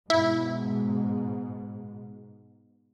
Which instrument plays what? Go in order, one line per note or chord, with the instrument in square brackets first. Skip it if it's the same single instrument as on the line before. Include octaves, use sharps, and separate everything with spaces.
[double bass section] G#2 B2 [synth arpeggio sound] E4